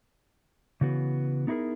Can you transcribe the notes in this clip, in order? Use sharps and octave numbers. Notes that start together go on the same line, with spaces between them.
C#3 E3 B3 F#4
B3 D#4 E4 F#4 G#4 A#4